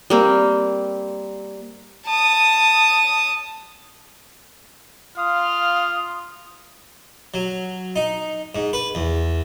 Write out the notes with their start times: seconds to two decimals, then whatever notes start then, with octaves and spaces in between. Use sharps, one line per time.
0.10 G3 A#3 C4
2.07 A5 D#6
5.17 F4 F5 D#6 F6
7.34 F#3
7.96 D#4
8.55 G#2
8.73 B4
8.95 E2